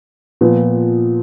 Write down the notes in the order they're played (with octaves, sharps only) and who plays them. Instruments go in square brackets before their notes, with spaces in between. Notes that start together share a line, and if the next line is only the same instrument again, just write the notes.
[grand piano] A#2 F3 B3